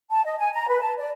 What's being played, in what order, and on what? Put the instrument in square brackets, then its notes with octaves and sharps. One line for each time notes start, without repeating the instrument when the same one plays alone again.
[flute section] A5
D#5
G#5
A#5
B4
A5
D5